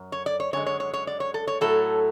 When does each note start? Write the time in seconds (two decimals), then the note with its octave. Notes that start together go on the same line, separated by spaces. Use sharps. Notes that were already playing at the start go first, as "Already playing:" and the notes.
Already playing: F#2
0.12 C#5
0.26 D5
0.40 C#5
0.53 F#2 D3 G#3 C#5
0.66 C#5
0.80 C#5
0.94 C#5
1.07 D5
1.20 C#5
1.34 A4
1.47 C#5
1.61 A2 F#3 A3 A4